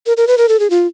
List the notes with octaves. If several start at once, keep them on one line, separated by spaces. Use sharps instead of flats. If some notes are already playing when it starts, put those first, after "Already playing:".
A#4
A#4
B4
A#4
A4
G#4
F4